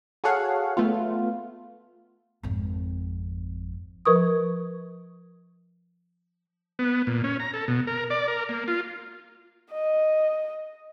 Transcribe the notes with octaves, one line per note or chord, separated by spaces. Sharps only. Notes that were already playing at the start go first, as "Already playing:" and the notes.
F#4 G#4 A4 C#5 F5 F#5
A3 B3 F4
G#1 F2
F3 A#4 B4 C#6 D#6
B3
A#2
C#4
A#5
A4
B2
A#4
D5
A#4
A#3
F4
D#5